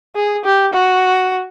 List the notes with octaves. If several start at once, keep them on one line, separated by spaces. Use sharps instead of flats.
G#4
G4
F#4